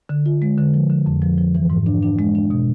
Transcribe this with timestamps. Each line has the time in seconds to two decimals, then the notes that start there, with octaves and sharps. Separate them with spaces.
0.09 D3
0.26 F4
0.42 G#3
0.58 D3
0.74 F3
0.90 D3
1.06 F2
1.22 F3
1.38 F3
1.55 E3
1.70 G#2
1.86 D4
2.03 D4
2.19 G#3
2.35 D4
2.50 B2